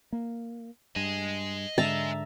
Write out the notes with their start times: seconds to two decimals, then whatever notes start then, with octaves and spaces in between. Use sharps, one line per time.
0.13 A#3
0.96 G2 D#5 G#5
1.78 G#2 D3 G#3 E5 A5 A#5